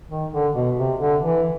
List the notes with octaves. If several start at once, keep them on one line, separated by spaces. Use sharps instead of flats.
D#3
D3
B2
C3
D3
E3